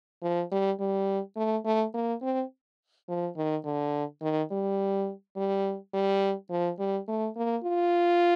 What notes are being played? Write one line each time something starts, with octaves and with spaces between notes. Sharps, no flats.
F3
G3
G3
A3
A3
A#3
C4
F3
D#3
D3
D#3
G3
G3
G3
F3
G3
A3
A#3
F4